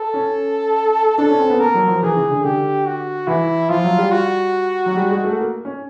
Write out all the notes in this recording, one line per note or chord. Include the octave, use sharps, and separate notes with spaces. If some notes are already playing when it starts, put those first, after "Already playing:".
Already playing: A4
C#4
D4 A4
C#4
C4
B3
A#3 A#4
F#3
F3
E3 G#4
C#3
D3
D3 G4
F#4
E3 E4
F3 F4
F#3
G3
F#4
F#3
G3
G#3
A3
A#3
C#4